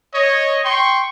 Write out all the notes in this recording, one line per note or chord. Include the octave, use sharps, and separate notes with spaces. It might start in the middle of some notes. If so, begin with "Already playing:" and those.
C#5 D#5
G5 C6 C#6